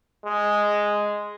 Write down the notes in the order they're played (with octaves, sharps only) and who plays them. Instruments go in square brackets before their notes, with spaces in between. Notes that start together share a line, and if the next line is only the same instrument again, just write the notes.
[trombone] G#3